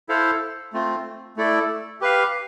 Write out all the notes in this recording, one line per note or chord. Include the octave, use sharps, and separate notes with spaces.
E4 A4 C5 F5
A3 C4 F4
A3 E4 A4 D5
G4 B4 F5